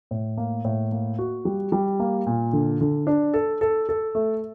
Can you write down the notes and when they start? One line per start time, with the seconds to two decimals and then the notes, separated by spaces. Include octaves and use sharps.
0.11 A2
0.37 A#3
0.65 A2
0.92 A#3
1.19 F#4
1.45 G3
1.72 G3
2.00 A#3
2.26 A#2
2.53 D3
2.81 D3
3.07 D4
3.34 A4
3.61 A4
3.89 A4
4.15 A3